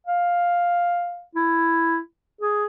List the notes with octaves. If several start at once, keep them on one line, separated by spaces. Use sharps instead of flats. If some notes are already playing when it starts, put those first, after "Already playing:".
F5
E4
G#4